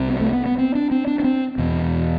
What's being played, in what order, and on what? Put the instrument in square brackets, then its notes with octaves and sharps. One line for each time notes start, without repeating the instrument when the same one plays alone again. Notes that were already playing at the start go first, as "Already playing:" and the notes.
Already playing: [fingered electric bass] C2 C3
B3
A3
B3
B3
C4
D4
C4
D4
D4
C4
E2 B2